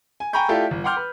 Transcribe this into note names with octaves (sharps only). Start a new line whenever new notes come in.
G#5
G5 G#5 A#5 B5 C#6 G6
A3 E4 F4 G4 A4 D5
G1
F#5 G5 C6 D6 F6 G6
B4